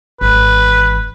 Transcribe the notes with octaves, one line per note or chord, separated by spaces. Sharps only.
G#1 E3 B4